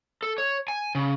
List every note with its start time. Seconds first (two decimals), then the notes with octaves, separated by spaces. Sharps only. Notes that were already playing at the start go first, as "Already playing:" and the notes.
0.23 A4
0.38 C#5
0.68 G#5
0.95 C#3